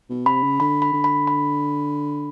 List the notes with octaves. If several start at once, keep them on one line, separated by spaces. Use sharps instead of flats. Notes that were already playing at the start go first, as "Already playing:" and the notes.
B2
C3 B5
C#3
D3 B5
B5
D3
B5
B5